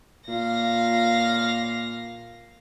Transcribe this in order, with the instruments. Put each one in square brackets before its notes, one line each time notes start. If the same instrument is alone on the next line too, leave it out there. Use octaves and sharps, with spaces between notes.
[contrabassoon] A#2 [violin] F5 A#6